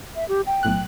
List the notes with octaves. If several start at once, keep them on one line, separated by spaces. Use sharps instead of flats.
E5
G4
G5
B1 A2 F#6